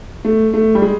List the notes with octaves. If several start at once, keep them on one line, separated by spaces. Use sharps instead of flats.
A3
A3
G3
G#3